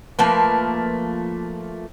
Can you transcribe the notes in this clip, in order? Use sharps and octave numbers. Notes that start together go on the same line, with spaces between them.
F3 A3 A#3 B4